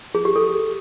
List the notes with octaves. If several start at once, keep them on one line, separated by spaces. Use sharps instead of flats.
G#4
G4
A4